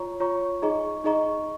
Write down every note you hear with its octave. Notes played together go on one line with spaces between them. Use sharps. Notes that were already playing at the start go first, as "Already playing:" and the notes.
Already playing: F4 C#5 A#5 C#6
F4 C#5 A#5 C#6
D#4 G#4 D#5 A#5 C#6
D#4 G#4 D#5 A#5 C#6